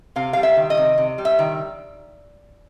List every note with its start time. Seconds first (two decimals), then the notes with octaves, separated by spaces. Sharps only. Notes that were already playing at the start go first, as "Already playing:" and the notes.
0.16 C3 F5
0.33 G3 F5
0.43 E5
0.57 D#3
0.70 D#5
0.77 C3
0.98 C3
1.18 G3
1.25 E5
1.39 D#3